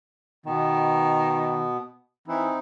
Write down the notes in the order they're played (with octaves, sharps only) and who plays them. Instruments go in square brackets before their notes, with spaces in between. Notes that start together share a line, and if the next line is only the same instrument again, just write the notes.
[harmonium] B2 B3 [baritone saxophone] D#3
[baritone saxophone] E3 [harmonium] C4 D#4 E4